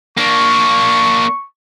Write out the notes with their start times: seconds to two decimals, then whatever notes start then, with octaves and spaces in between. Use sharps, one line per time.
0.18 A#3 D4 C#6